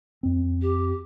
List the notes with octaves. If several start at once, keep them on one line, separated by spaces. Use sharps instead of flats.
F2 C4
G4